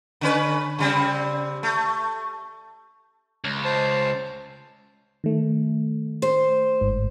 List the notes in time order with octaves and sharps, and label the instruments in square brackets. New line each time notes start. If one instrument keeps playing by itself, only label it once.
[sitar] D3 C#4 B4
C#3 G3 C4
A3
[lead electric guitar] C#2
[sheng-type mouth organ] C5 A5
[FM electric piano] D#3 A3
[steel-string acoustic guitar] C5
[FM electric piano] G1 G#2